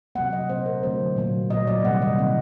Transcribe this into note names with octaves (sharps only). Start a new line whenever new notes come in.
C3 F#3 A#3 F#5
D#5
A#2 A3 C4 C5
A#4
D3 F#3 A3 C4 C5
A#2 F#3 A#3
A#2 F#3 A#3 D#5
D5
C3 D#3 G3 A#3 F#5
D#5
D#3 F#3 C4 F#5